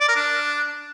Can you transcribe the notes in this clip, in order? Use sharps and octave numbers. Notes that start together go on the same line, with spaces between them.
D5
A#4
D4